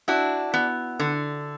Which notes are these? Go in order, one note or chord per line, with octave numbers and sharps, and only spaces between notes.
D4 E4 F#4
B3
D3